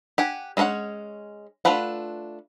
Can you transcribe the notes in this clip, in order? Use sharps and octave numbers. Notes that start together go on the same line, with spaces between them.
G4 F#5 G#5
G#3 C#4 A#4 C#5 F#5
A3 D4 F4 B4 F#5